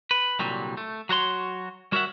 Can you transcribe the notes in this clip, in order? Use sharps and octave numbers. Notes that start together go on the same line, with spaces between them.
B4
C2 A#2 D3 F#3 G3
A3
F#3 F#4 C#5 C6
G3 F#4 A#4 C#5 E5 F#5